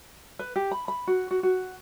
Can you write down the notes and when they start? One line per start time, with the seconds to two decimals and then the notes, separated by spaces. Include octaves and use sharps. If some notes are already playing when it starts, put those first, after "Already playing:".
0.39 B4
0.56 G4
0.71 B5
0.88 B5
1.07 F#4
1.31 F#4
1.43 F#4